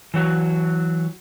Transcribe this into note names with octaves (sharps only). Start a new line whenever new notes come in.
E3 F#3 F#4